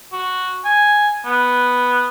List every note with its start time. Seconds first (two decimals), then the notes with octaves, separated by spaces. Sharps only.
0.12 F#4
0.65 G#5
1.25 B3